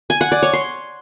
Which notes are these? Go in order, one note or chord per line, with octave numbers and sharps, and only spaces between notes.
G#5
F#5
D5
C#5
C6